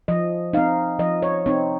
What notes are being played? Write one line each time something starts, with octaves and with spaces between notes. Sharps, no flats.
F3 D#5
C4 D#4 F5
F3 D#5
C#5
C4 D#4 C#5